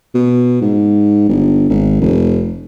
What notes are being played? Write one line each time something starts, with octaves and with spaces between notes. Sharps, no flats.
B2
G#2
G1
G#1
F1